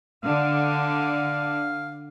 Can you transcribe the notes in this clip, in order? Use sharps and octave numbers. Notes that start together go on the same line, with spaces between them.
D3 F5